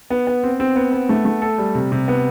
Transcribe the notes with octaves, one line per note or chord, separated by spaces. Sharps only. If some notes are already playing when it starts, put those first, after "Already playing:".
B3
B3
C4
C4
B3
B3
A3
A3
A4
G3
C3
C3
B3